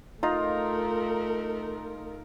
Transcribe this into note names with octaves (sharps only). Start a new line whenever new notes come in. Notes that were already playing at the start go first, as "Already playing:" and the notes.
A3 D#4 F4 A#4 A#5